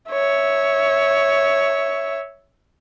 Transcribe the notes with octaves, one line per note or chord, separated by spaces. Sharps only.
C#5 E5